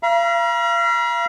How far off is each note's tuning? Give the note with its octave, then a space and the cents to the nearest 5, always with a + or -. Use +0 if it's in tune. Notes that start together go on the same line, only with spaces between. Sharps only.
F5 -40 A#5 +45